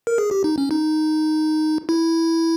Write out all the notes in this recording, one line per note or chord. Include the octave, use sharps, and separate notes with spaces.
A#4
G#4
G4
D#4
C#4
D#4
E4